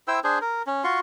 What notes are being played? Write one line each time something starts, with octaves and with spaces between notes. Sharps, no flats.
E4 C5 G5 E6
D4 G#4 C5
A#4
C#4
F4 F#4 C6 C#6